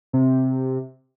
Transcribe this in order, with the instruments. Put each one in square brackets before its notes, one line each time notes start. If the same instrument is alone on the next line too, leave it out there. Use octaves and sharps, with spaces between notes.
[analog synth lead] C3